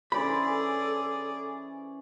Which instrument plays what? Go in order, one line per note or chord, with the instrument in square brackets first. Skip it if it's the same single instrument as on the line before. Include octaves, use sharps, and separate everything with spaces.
[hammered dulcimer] E3 C#4 C5 [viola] G#4 D5 [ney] A4 [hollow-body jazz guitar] B5